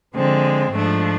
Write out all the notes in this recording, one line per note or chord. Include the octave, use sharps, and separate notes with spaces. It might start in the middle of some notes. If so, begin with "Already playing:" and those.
D3 F3 G#3 C4
G#2 F3 A3 D4